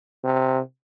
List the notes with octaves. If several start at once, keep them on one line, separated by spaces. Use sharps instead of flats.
C3